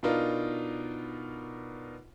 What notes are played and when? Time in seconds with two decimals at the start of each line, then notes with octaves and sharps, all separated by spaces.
0.03 B2 D4 D#4 F4 A#4